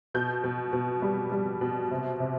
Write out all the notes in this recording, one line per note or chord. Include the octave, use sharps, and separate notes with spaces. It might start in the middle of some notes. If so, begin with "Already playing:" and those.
B2 G6
B2
B2
G3
G3
B2
C3
C3